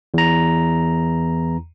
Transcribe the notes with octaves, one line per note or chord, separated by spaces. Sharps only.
E2 A#5